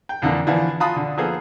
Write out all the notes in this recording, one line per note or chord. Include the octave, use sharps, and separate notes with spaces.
G5
F2 D3 E3 A#3
D3 E3 F3 B3 D4
F4 F#4 F#5 A5 B5 D#6
D3
F3 A#3 B3 G#4 A4